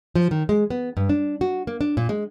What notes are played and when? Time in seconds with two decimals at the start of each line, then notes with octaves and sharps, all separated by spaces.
0.15 F3
0.31 D#3
0.49 G#3
0.70 B3
0.97 G2
1.09 D4
1.41 F#4
1.67 A#3
1.81 D4
1.97 A#2
2.09 G#3